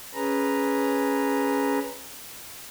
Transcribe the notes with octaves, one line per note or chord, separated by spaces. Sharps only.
C#4 G#4 B4 A#5